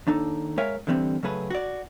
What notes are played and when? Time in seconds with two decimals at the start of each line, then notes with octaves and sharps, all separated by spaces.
0.07 D#2 D4 D#4 A4
0.58 G#3 A#4 C#5 E5 F5 G#5
0.87 D3 E3 G3 A3 C4
1.23 C#3 F#3 A3 G#4 B4
1.50 F#4 D5